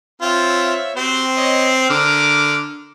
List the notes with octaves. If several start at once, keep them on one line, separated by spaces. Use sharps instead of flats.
C4 F4 C#5 E5
C4 F#4 G4 C5
C#5 D#5
D3 A#4 D6 F6